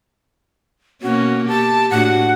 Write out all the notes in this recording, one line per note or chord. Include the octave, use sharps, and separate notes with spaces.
B2 A#3 C#4 F#4
G4 A5
A2 D4 F#4 F#5